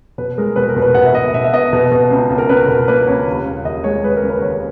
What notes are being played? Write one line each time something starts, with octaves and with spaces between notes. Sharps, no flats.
B2 B4
G#3 A#4
B2 B4
A#4
B2
B4
B2 F#5
E5
B2 D#5
B2 E5
E5
B3 D#5
B2
B2
C#2
C#2
A#4
C#2 B4
B2 A#4
A#3 B4
C#2 C#5
D#2
C#3
D#2 D#5
G#3 C#5
G#3 B4
A#4
C#3
B4
D#2 C#5